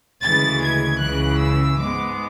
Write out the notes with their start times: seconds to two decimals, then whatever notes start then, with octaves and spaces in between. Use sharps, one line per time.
0.23 D2 C#3 E3 G#3 A6
0.62 G#6
1.00 C#2 C#3 E3 F#6
1.40 E6
1.79 G#2 G#3 B3 D6